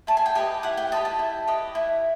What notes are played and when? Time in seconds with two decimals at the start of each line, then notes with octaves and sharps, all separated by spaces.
0.07 E4 A5
0.17 G#5
0.26 G5
0.35 G4 B4 D#5 G#5
0.63 E4 F#5
0.77 G5
0.92 G4 B4 D#5 A5
1.05 A5
1.19 E4
1.47 G4 B4 D#5
1.75 E4